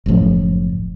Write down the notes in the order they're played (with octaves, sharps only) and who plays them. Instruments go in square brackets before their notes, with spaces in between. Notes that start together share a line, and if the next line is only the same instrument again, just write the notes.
[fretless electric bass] F#1 C#2 A2 F3